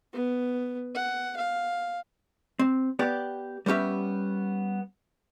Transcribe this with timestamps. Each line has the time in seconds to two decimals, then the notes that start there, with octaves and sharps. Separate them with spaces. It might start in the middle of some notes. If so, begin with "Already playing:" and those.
0.13 B3
0.95 F#5
1.37 F5
2.59 C4
2.99 B3 G4 D5
3.66 G3 B3 C#4 G4 E5